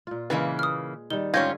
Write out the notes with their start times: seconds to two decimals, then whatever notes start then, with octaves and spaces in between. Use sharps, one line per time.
0.07 A#2 F4
0.30 C#3 E3 G#3 A#3 B4
0.59 D#6 F6
1.10 D#3 G3 G7
1.34 G#2 D3 C#4 F4 G4 C#5 G#6 A#6